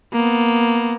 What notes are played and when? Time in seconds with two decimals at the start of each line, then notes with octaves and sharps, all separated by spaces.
0.13 A#3 B3